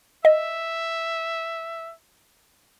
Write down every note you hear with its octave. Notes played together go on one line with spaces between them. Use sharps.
D#5 E5